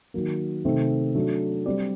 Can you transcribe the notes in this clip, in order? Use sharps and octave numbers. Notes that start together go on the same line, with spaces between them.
D#3 F#3 A#3
C3 D#3 A3 C4 D#4
F#3 A3 D4
G3 C4 G4 D5